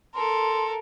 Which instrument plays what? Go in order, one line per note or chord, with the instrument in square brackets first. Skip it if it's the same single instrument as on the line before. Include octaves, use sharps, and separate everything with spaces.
[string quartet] A4 A#4 [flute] C6